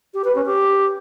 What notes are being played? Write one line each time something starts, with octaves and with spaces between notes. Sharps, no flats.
G4
B4
C#4
G4